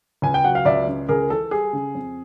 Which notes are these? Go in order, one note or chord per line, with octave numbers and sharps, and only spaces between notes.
C#2 G#5
G5
F#3 F#5
F5
C#2 D5 E5
C#3
C#2 G#4 A#4
E3 A4
G3 G#4
C#3
F2